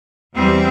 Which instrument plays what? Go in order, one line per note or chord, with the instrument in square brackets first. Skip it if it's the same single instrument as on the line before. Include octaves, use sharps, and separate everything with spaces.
[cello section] E2 E3 G3 C4